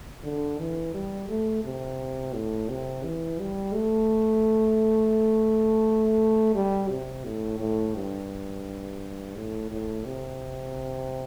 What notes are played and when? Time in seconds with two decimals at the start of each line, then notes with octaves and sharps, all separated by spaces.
0.24 D3
0.59 E3
0.94 G3
1.29 A3
1.64 C3
2.34 A2
2.69 C3
3.04 E3
3.40 G3
3.74 A3
6.55 G3
6.90 C3
7.25 A2
7.60 A2
7.96 G2
9.36 A2
9.71 A2
10.05 C3